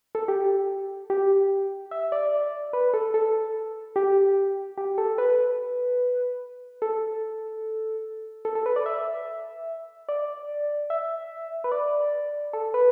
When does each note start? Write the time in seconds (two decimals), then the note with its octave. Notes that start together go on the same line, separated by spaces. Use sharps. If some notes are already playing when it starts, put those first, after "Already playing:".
0.15 A4
0.28 G4
1.10 G4
1.91 E5
2.12 D5
2.73 B4
2.94 A4
3.14 A4
3.96 G4
4.78 G4
4.98 A4
5.18 B4
6.82 A4
8.45 A4
8.55 A4
8.66 B4
8.76 D5
8.86 E5
10.09 D5
10.90 E5
11.64 B4
11.72 D5
12.53 A4
12.74 B4